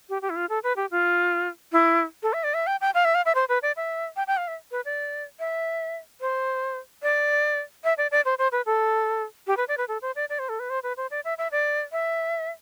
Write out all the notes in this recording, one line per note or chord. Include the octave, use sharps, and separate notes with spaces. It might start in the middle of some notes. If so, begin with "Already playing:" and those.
G4
G4
E4
F4
A4
B4
G4
F4
E4
A4
E5
D5
E5
G5
G5
F5
E5
F5
E5
C5
B4
D5
E5
G5
G5
F5
E5
B4
D5
E5
C5
D5
E5
D5
D5
C5
C5
B4
A4
G4
B4
D5
B4
A4
C5
D5
D5
C5
A4
B4
C5
B4
C5
D5
E5
E5
D5
E5